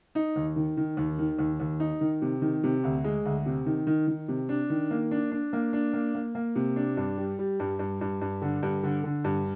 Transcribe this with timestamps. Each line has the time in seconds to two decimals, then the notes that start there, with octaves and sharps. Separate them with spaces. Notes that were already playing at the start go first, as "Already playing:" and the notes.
0.15 D#4
0.36 D#2
0.56 D#3
0.77 D#3
0.97 D#2
1.19 D#3
1.39 D#2
1.60 D#2
1.80 D#4
2.01 D#3
2.22 C3
2.42 D#3
2.64 C3
2.84 D2
3.04 G#3
3.25 D2
3.46 C3
3.66 D#3
3.87 D#3
4.07 D#3
4.28 C3
4.49 D4
4.70 D#3
4.91 A#3
5.11 D4
5.32 D4
5.53 A#3
5.73 D4
5.93 A#3
6.15 A#3
6.35 A#3
6.55 C3
6.76 D4
6.97 G2
7.18 G3
7.39 G3
7.60 G2
7.79 G2
8.01 G2
8.21 G2
8.42 D3
8.63 G2
8.83 D3
9.04 D3
9.25 G2